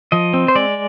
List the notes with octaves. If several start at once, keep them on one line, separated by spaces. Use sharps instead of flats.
F3 D#5
C4
C5
G#3 D5